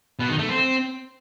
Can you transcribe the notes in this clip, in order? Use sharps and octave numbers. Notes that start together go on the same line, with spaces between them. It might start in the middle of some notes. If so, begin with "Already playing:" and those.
B2
D#3
A3
C4